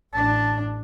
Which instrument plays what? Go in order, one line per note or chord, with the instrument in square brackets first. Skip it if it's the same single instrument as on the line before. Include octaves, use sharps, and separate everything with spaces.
[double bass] A1 D4 [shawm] A5